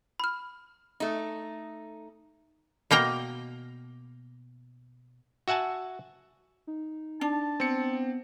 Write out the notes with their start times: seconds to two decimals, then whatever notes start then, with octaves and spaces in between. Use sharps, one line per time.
0.20 B5 F6
1.00 A3 D#4
2.91 B2 A#3 G5 A#5
5.48 F#4 E5 F#5 G#5 A5
6.67 D#4
7.21 D4 A5
7.60 B3 C4 C#7